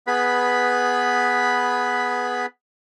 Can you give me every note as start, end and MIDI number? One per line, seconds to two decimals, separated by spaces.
0.07 2.46 59
0.07 2.46 68
0.07 2.46 71
0.07 2.46 83